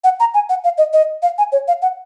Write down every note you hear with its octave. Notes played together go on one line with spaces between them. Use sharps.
F#5
A#5
G#5
F#5
F5
D#5
D#5
F5
G#5
C#5
F5
F#5